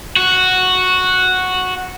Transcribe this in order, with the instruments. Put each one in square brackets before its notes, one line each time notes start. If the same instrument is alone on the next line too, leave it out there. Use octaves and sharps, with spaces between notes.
[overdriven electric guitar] F#4